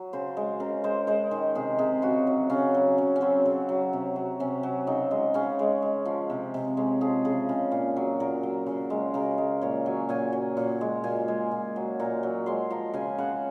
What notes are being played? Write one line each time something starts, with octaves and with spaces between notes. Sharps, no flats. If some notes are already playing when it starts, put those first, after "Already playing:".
Already playing: F#3
C#3 C5
G#3
C#3 A#4
G#3 C5
G#3 C5
D#3
C3 G#4
C3 G#4
C#3 F#4
F#3
C#3 C#4
F#3
C#3
C#4
F#3 C4
C#3
F#3
C3
F#3
C3 C#4
F#3
C#3 D#4
G#3 D#4
C#3 C#4
G#3
G#3
F3
C3
C3
G#3 C#4
F3 G#4
C#3 G#4
C#3
A#2
F#3
A#2 A#4
F#3
C#3
G#3
C#3 A#4
G#3
A#2 C#5
F#3 G#5
A#2 G#5
F#3
A#2
G#3
A#2 G#5
G#3
A#2
F#3
A#2 A#5
F#3
G#3 C6
F3 A#5
C#3 G#5
C#3 F#5